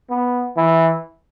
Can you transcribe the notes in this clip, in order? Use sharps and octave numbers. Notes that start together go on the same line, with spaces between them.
B3
E3